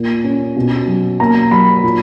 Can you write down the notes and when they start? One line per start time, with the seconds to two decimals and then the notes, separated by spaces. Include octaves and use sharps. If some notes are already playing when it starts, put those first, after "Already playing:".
Already playing: A#2 A#3
0.24 C#4
0.56 B2
0.87 F#3
1.20 A#3 A#5
1.51 F#3 B5
1.83 A#2